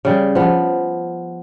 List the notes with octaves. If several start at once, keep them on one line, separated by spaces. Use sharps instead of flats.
C#3 G3
F3 B3